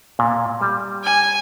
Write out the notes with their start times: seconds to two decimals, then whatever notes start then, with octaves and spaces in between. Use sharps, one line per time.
0.19 A#2
0.61 G3
1.04 G#5